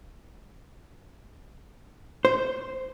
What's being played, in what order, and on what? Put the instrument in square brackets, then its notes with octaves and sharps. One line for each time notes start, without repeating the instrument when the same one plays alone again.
[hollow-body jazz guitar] C5